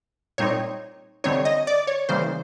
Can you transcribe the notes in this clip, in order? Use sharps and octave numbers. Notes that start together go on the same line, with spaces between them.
A#2 G3 C4 D#4 C#5
D3 G3 C4 D#4 C#5
D#5
D5
C#5
C#3 E3 G3 A#3 C5